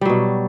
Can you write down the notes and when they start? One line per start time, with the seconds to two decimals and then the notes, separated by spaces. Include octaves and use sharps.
0.01 G3
0.05 F#3
0.09 B2